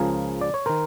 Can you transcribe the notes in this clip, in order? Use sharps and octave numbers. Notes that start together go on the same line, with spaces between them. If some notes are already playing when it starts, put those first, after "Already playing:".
Already playing: C#2 C#3 F3 G#4 A#4
D5
C#5
D#3 A#4 C5